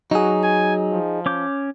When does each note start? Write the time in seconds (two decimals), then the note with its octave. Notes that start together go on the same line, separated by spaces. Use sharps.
0.11 F#3 D#4 F#4 G#4
0.43 G#5
0.92 F3
1.26 C#4 D6 G6